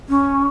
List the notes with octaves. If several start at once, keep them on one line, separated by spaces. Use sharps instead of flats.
C#4